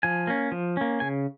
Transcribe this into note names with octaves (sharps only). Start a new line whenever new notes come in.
F3 G#5
A#3 C#4
F3
A#3 C#4
C#3 G#5